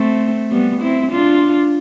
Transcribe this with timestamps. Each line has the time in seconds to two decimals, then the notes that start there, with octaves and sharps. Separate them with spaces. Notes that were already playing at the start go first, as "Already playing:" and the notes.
Already playing: A3 C4
0.52 G3 B3
0.82 C4 E4
1.11 D4 F4